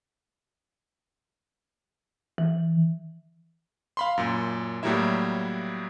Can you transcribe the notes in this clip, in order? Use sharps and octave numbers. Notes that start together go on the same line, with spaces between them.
E3
F5 B5 C6
F#2 A#2
A2 F#3 G3 A#3 E4 E5